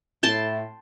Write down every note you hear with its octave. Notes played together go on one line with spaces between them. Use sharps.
A2 E4 G5 A5 C6